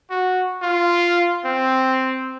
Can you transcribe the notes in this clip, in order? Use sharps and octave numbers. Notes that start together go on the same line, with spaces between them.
F#4
F4
C4